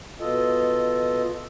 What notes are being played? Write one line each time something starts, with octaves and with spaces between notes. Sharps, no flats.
B2 F4 A4 D#5